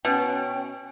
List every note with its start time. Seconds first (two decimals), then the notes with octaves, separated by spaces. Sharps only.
0.05 B2 C#4 G5